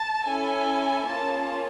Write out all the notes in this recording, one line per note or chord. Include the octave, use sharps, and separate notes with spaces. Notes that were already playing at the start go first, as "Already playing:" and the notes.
Already playing: A5
C#4 E4 A4 G#5
A#3 C#4 F4 G#4 A5